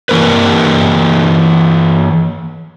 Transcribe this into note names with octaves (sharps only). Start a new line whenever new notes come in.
E3 A#3 A#4 B4